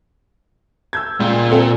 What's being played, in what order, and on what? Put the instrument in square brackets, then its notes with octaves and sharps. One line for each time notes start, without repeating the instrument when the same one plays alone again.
[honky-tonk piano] E6 G6 G#6
[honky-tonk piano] C#2 [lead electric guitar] A#2
[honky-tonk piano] C4 A4